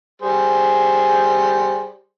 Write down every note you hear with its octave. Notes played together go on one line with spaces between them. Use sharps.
G3 G#4 C5